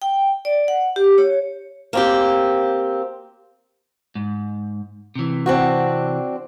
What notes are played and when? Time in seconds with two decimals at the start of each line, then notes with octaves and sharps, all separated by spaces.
0.02 G5
0.45 D5
0.68 F#5
0.96 G4
1.18 C#5
1.93 A#3 C4 G4
4.15 G#2
5.15 C3 E3
5.46 C4 D4 F#4